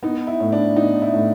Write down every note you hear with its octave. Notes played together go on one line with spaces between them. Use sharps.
B3 D#4
E4
A2
D4
B3 D#4
E4
A2